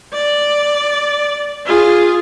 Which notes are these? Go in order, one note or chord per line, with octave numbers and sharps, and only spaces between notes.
D5
F4 G#4